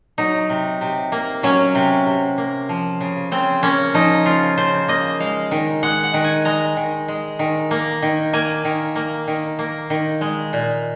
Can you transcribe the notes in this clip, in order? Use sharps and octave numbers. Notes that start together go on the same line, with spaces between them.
F#3 D#4
C3
C3
A#3
F#3 C#4
C3
C3
A#3
F3
C#3
C#3 C4
A#3 C#4
F3 D#4
C#3 F4
C#3 C5
A#3 D#5
G#3 F5
D#3
G#3 F#5
F#5
D#3
G#5
G#3 A#5
D#3
G#3
D#3
A#3
D#3
A#3 G#5
D#3
A#3
D#3
A#3
D#3
G#3
A#2